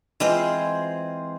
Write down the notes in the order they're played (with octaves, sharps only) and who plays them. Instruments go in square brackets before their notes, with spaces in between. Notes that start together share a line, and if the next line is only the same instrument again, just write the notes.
[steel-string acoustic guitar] E3 G#3 C4 F4 G#4 C5